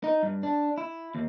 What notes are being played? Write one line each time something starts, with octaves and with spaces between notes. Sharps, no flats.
D#4
G2
D4
E4
D#2